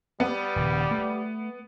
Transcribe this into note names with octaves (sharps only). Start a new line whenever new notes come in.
G3 B3
D#1 C#3
A3